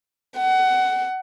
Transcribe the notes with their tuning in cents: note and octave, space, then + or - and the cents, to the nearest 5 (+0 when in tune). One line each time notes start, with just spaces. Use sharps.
F#5 +20